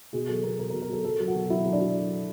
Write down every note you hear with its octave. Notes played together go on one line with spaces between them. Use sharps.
B2 G#4
F#3 A4
B2 A#4
B2 A#4
A#4
B2
A#4
F#3 A4
F#3 A4
F#3
F#4
B2
F#3 E4
F#3
D4
F#3